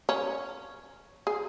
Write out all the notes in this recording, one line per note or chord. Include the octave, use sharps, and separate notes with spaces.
C#4
G#4